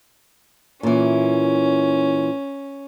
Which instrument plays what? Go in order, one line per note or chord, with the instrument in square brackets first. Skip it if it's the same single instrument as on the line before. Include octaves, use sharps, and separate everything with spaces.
[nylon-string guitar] A#2 E3 [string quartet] C#4